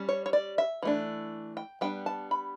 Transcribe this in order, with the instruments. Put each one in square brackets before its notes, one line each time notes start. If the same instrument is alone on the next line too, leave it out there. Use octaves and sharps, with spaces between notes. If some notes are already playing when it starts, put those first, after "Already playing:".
Already playing: [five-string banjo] G3 C#4
C#5
C#5
D5
E5
E3 A3 D4
G5
G3 B3 D4 G5
A5
B5